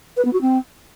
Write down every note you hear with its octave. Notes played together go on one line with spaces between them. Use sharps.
B4
B3
F#4
C4